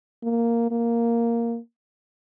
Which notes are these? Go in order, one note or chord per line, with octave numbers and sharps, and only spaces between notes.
A#3
A#3